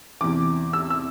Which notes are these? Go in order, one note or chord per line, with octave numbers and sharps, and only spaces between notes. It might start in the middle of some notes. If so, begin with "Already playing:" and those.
E2 C3 E3 D6
E6
E6